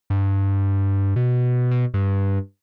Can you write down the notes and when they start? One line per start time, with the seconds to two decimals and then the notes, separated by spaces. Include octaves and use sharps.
0.10 G2
1.16 B2
1.71 B2
1.94 G2